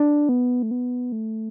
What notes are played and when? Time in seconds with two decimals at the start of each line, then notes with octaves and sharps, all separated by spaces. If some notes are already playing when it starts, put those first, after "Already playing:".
Already playing: D4
0.29 B3
0.63 A3
0.71 B3
1.12 A3